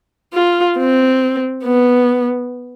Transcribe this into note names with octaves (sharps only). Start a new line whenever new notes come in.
F4
C4
B3